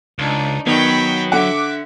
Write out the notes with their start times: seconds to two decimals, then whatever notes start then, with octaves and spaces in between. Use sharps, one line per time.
0.18 C#2 D4 D#4
0.67 D#3 F#3 B3 G5 B5
1.32 D3 E5 F#5 D6